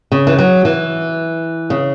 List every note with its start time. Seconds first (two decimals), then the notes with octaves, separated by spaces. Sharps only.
0.12 C#3
0.27 E3
0.39 F#3
0.65 E3
1.70 C#3